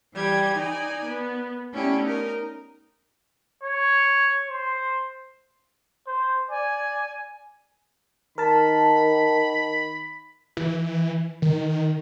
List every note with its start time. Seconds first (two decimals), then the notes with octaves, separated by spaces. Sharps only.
0.15 E3 G3 G5 G#6
0.56 D#4 D5 G#5
1.07 B3
1.74 A3 B3 C#4 E4 G4 D5
2.04 D#4 A#4
3.63 C#5
4.48 C5
6.07 C5
6.50 D5 G#5
8.38 D#3 A#4 A5 B5
10.57 E3
11.42 D#3